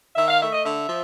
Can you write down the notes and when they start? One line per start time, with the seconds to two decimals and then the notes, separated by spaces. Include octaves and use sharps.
0.16 D#3 E5
0.28 F5
0.40 A3 E5
0.52 D#5
0.64 D3 E5
0.87 F3